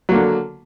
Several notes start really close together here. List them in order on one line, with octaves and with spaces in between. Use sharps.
F#3 A#3 D3